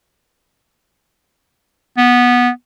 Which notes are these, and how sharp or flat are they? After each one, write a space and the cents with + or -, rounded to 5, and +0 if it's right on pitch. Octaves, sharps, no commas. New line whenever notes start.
B3 -10